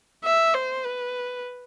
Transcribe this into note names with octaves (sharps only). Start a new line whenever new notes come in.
E5
C5
B4